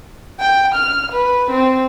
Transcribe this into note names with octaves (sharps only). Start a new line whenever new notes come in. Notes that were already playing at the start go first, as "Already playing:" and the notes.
G5
F6
B4
C4